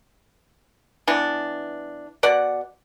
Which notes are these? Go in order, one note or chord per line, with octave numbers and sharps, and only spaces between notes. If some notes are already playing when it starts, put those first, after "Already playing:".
E3 B3 D4
B2 D5 F#5